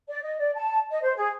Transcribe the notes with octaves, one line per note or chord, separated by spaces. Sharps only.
D5
D#5
D5
A5
D#5
C5
G#4